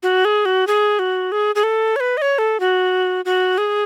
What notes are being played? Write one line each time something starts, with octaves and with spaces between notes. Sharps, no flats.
F#4
G#4
F#4
G#4
F#4
G#4
G#4
A4
C#5
B4
D#5
C#5
A4
F#4
F#4
G#4